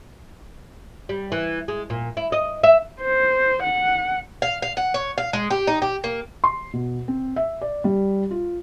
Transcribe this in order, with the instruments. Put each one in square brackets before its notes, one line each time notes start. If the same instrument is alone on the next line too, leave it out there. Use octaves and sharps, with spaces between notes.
[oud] G3
E3
G#3
A#2
E4
D#5
E5
[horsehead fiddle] C5
F#5
[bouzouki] F5
F5
F#5
C#5
F5
G#3
G4
D#4
G4
A#3
[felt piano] C6
B2
C4
E5
D5
G3
F4